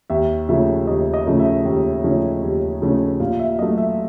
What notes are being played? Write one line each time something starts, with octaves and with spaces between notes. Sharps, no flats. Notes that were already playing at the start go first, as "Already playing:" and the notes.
D#2 E5
C#3 F3 A3 C#4 E5
D#2 D#5
D#5
C#3 F3 A3 C#4
E5
D#2
C#3 F3 A3 C#4
D#2
C#3 F3 A3 C#4
A#2 F5
E5
F#3 A3 D#5
E5